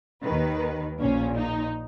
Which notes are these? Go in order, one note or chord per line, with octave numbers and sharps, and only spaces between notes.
D#2 D#3 B4
A#1 A#2 C#4
D#4